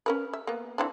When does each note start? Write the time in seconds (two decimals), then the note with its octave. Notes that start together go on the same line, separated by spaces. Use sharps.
0.06 C#4 A#4 B4
0.33 E5
0.47 A#3 B3
0.78 E3 C4 D4